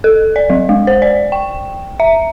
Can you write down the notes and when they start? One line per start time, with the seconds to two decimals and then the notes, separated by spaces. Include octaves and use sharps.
0.04 A4
0.36 D5
0.50 F#3
0.69 G#3
0.87 C5
1.02 D5
1.32 G5
2.00 E5